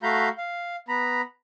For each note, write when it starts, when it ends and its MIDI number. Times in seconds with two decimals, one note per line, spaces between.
0.03 0.29 57
0.03 0.29 66
0.03 0.29 77
0.03 0.29 82
0.03 0.29 83
0.03 0.29 91
0.38 0.76 77
0.89 1.22 59
0.89 1.22 82
0.89 1.22 83